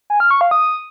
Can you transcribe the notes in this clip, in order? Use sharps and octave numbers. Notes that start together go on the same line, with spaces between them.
G#5
F6
C#6
F5
D#6